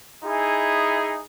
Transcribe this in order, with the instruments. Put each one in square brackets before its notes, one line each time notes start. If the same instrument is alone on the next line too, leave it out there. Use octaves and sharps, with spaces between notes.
[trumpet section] D#4 E4 G#4